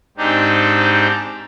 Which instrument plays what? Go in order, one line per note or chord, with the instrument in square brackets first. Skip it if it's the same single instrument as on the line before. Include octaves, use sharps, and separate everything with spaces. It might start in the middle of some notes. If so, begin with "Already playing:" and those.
[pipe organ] G#2 C4 D4 D#4 G4